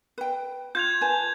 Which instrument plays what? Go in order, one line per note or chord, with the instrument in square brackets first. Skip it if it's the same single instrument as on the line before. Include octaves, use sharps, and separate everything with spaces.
[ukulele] B4 G5
[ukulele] F4 [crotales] G6 G#6 F7
[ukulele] B4 G#5 A5